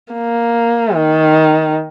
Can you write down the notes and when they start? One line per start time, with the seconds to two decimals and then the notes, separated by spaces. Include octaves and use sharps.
0.13 A#3
0.95 D#3